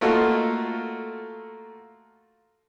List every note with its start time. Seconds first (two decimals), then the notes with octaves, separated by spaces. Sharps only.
0.01 A3 A#3 F4 F#4 A4 D#5